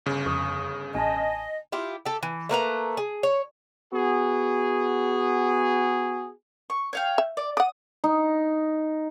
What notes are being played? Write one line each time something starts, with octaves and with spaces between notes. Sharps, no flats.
G1 C#3
F2 C#6 D#6
A1 D#5 G#5 A5
E4 F4 G4
G4 A4
E3
A3 A#3 B4 A#5
G#4
C#5
B3 F#4 G#4
C#6
C#5 F5 G5
E5
D5
D5 F#5 D#6
D#4